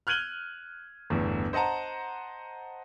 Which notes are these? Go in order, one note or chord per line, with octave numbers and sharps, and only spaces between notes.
F6 F#6 G#6 D#7 F#7 G7
G1 E2 A2
C5 D#5 F#5 A5 A#5